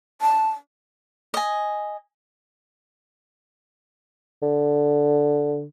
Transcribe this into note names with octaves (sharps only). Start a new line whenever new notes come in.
A5
D#5 G#5
D3